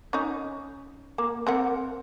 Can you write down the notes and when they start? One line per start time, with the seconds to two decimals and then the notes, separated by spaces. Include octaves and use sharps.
0.13 C#4 D#4
1.18 A#3
1.47 C4 A#4 F#5